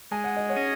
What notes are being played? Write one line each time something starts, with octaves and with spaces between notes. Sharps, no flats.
G#3 G#5
F#5
D#5
C#5 F#5
C#4 G#4 D#5